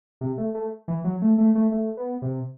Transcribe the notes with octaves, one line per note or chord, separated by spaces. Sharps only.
C3
A3
A3
E3
F#3
A3
A3
A3
A3
B3
C3